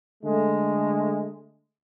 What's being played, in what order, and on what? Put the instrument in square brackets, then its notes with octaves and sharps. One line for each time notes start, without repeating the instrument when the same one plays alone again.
[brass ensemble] D3 G#3 A3